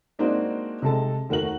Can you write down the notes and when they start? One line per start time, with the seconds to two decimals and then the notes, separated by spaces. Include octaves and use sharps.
0.19 G#3 A#3 C4 D4 D#4 F#4
0.82 C3 G#3 A4 A5
1.29 D#2 A3 F#4 A#4 F#5 F#7